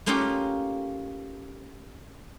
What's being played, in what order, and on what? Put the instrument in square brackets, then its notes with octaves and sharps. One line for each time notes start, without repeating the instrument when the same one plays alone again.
[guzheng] A3 A#3 C#4 D#4 F4 G4